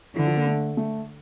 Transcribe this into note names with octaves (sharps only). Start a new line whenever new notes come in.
D3 E3
F3
A#3
A3
A3